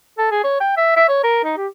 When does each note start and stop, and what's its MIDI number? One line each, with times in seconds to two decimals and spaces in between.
0.18 0.26 69
0.31 0.43 68
0.44 0.60 73
0.60 0.73 79
0.77 0.92 76
0.96 1.04 76
1.08 1.20 73
1.23 1.41 70
1.44 1.54 63
1.57 1.67 67